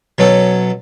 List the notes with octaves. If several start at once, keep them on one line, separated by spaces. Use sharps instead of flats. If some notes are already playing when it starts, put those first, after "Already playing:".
B2 F#3 C#4 A4